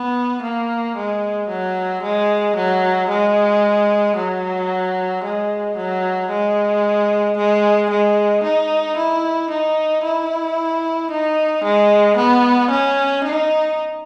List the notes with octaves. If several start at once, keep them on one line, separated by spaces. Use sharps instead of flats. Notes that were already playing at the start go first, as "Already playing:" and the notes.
Already playing: B3
A#3
G#3
F#3
G#3
F#3
G#3
F#3
G#3
F#3
G#3
G#3
G#3
D#4
E4
D#4
E4
D#4
G#3
B3
C#4
D#4